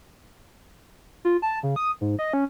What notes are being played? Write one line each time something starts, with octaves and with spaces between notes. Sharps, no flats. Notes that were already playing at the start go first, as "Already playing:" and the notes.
F4
A5
C#3
D#6
G#2
D#5
C#4